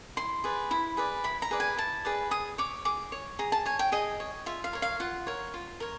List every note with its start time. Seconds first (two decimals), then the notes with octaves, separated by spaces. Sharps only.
0.17 E4 C6
0.44 G#4 B4 D5
0.71 E4 B5
0.97 G#4 B4 D5
1.24 E4 B5
1.42 A#5
1.51 G#4 B4 D5
1.60 G#5
1.78 E4 A5
2.05 G#4 B4 D5
2.31 G#4 D#6
2.58 C#5 D6
2.85 G#4 D6
3.12 C#5
3.39 G#4 A#5
3.52 A5
3.66 C#5 G#5
3.79 G5
3.92 G#4 D#5
4.20 C#5
4.46 F4 E5
4.64 F5
4.73 A#4 C#5
4.82 F5
5.00 F4 F#5
5.27 A#4 C#5
5.54 F4
5.80 A#4 C#5